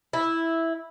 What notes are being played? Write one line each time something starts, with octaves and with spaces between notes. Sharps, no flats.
E4